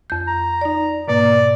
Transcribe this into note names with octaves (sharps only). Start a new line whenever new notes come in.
F2 G6
A#5
D#4 D5
G#2 B2 A#3 D5